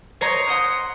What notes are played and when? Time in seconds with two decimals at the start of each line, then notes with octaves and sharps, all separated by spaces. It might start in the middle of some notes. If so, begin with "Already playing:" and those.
0.21 C5 C#5 D#5 A#5
0.47 F#5 C6 D#6